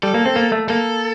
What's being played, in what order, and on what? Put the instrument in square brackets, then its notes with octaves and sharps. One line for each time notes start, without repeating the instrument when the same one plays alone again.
[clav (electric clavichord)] G3 [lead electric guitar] A4
[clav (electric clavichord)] A#3
C4
A#3
A3
[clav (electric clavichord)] A#3 [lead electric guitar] A4